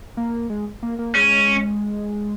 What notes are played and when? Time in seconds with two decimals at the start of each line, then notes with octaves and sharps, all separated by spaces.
0.17 A#3
0.50 G#3
0.83 A#3
0.99 A#3
1.15 G#3 C#4